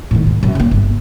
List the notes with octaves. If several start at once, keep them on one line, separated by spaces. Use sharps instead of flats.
A2 D#3
G#2
F#2 A#2
C#3 A#3
G1